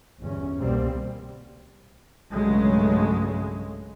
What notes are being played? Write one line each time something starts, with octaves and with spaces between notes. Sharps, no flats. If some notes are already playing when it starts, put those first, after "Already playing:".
G1 E2 C#4
C2 B2 G3 A#3 C4
B1 G2 C#3 F#3 G#3 A3